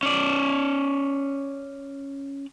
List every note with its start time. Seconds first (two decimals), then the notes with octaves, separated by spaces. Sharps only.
0.03 C#4 D5